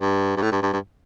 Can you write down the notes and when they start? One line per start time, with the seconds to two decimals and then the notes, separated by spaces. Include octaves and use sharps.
0.01 G2
0.37 G2
0.42 A2
0.52 G2
0.62 G2
0.73 G2